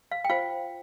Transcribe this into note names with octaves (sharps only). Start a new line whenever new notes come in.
F5
G5
F4 C5 F5